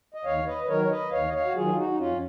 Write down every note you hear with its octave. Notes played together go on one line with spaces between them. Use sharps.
D#5
D#2 C#5 F5
B4 D#5
B4
D#3 F#3 A#4 C#5
C#5
B4 D#5
D#2 C#5 F5
D#5
C#5 F5
F#4
D#3 F#3 F4 G#4
F4
D#4 F#4
D#4
F2 C#4 F4